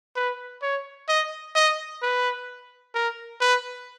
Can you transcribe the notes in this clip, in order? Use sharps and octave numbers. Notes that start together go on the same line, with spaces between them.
B4
C#5
D#5
D#5
B4
A#4
B4